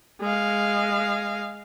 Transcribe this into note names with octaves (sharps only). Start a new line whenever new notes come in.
G#3 F5